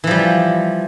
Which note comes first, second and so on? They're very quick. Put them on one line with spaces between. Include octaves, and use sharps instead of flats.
E3 F3 G3